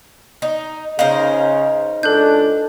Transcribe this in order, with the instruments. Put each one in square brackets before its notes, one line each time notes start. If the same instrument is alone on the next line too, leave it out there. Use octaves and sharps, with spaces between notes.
[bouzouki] D#4
[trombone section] C#3 [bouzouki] D#4 A#4 C5 [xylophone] F5
[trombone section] C#2 D4 [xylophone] A4 F#6 G6